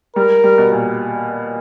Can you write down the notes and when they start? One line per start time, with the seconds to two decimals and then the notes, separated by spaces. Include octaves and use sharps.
0.16 G3 A#4
0.44 G3
0.58 B2
0.72 A#2